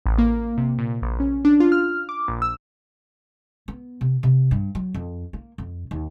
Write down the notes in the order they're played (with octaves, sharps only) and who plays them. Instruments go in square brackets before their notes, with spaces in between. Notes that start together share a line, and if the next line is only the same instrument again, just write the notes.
[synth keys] A1
A#3
C3
A#2
A#1
C#4
D4
F4
F6
D6
A#1
E6
[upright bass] B3
C3
C3
G2
F#3
F2
A#3
F2
D#2